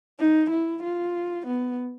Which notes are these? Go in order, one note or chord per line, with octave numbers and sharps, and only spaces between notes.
D#4
E4
F4
B3